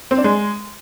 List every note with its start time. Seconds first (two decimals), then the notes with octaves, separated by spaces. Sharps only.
0.11 C4
0.18 D4
0.24 G#3